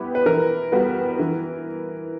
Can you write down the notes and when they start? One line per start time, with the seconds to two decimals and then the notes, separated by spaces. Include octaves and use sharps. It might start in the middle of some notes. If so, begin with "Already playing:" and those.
Already playing: G3 B3 E4 G4
0.15 B4
0.26 E3 A#4
0.72 G3 B3 F#4 B4
1.19 E3